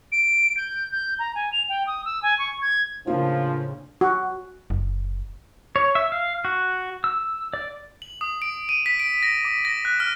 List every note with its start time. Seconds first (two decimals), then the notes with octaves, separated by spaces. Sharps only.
0.12 D7
0.57 G6
0.92 G6
1.19 A#5
1.35 G#5
1.53 F7
1.69 G5
1.87 D#6
2.05 E6
2.23 G#5
2.39 C#6
2.62 G#6
3.07 A2 C#3 F3 A#3 D4 F4
4.01 F#4
4.70 F#1
5.76 C#5
5.95 E5
6.12 F5
6.45 F#4
7.04 E6
7.53 D5
8.02 F#7
8.21 D#6
8.42 D7
8.69 D#7
8.86 B6
9.00 D7
9.23 A#6
9.45 D6
9.65 A#6
9.85 F#6
10.00 F6